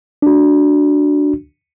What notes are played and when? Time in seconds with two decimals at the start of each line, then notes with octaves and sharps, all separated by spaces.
0.22 D4 F#4